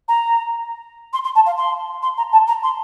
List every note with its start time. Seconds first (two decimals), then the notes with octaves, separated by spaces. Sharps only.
0.08 A#5
1.13 C6
1.24 C6
1.35 A5
1.46 F5
1.58 C6
2.03 C6
2.18 A#5
2.32 A5
2.48 A#5
2.63 C6